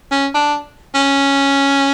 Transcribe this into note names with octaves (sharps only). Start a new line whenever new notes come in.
C#4
D4
C#4